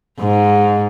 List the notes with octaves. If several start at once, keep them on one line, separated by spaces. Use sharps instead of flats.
G#2